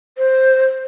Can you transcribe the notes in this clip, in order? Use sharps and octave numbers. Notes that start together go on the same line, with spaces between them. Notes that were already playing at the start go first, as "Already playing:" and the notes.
C5